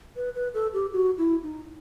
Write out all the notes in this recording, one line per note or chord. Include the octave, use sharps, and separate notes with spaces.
B4
B4
A4
G4
F#4
E4
D#4